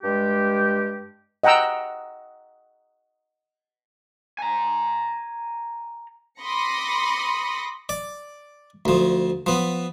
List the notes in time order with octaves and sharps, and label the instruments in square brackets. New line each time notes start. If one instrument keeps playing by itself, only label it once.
[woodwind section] G2 G#3 G4
[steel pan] D#5 F#5 G5 A#5 E6
[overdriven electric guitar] G#5 A#5
[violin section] B5 C6 D6 D#6 A#6 C#7
[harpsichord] D5
D2 F3
F3 B3